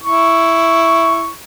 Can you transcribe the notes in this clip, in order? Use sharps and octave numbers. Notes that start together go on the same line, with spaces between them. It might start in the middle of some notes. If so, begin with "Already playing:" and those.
E4 C#6